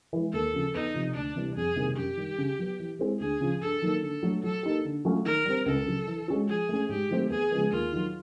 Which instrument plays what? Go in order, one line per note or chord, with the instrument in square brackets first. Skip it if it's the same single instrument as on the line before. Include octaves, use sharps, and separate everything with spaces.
[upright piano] E3 G#3
[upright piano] D#2 [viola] A4
[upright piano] C#3 F3
[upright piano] E2 [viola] D#4
[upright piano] C3 F3
[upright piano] D2 [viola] D4
[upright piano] C3 E3 G3
[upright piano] F2 [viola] G#4
[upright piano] C3 D#3 G3 A#3
[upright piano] F#2 [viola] G4
[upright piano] D#3 G3
C#3
F#3 B3
E3
G#3 C4 E4 G#4
[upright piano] D2 [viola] G#4
[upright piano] C#3 F3
[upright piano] G2 [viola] A4
[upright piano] D#3 F#3 A#3 D#4
[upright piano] D3 [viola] A4
[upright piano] F#3 A3 D4
[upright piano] F#3 [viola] A4
[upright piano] A#3 D#4 G4
D3
F#3 A3 C#4 F4
[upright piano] D#3 [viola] A#4
[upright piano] G3 C4
[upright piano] C#2 [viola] A4
[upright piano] C#3 F#3
E3
G#3 C#4 F#4
[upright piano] F3 [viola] G#4
[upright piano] A3 C#4
[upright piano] G#2 [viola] G4
[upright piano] D#3 F#3 A3 C4
[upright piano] E2 [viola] G#4
[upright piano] C#3 F3 G#3 B3
[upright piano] D#2 [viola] F4
[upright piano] D#3 F#3